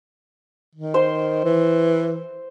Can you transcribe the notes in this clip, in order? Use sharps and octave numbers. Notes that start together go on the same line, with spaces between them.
D#3
C5 C6
E3